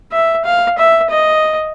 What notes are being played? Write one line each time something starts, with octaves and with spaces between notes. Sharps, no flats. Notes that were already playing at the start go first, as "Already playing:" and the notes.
E5
F5
E5
D#5